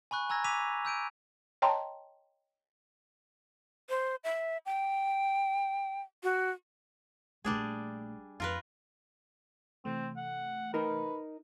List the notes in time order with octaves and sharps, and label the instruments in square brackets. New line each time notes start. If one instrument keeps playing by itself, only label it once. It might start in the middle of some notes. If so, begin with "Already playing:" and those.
[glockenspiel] G#5 B5 C#6 F#6
G#5 A#5 E6 G#6 A#6
G#5 D6 E6 B6 D#7 F7
E6 G6 D7 D#7
[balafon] C#5 D#5 G5 A5 A#5 C6
[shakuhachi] C5
E5
G5
F#4
[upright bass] A#1 A3 [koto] G3 D4 G#4
[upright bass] F2 [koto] F4 A#4 B4
[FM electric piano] C3 E3 A3 [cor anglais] C4
[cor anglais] F#5
[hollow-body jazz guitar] D#4 A#4 [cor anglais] B4